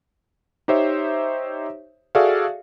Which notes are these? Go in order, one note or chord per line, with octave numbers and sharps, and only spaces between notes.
D#4 G4 C5 C#5 E5
F#4 G#4 A4 D5 E5 F5